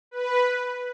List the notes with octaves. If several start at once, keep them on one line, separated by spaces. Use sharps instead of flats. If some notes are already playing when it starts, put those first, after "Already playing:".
B4